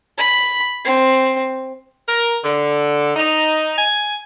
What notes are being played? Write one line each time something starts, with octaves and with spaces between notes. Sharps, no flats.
B5
C4
A#4
D3
D#4
G#5